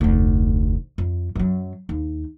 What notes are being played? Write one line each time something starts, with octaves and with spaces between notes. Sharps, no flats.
F1 D2
F2
F#2 F#3
D#2